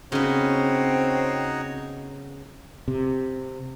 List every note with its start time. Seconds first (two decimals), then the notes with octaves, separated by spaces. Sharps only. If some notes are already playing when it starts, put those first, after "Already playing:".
0.12 C#3 B3 C4 D#4 F#4 C#5
2.88 C3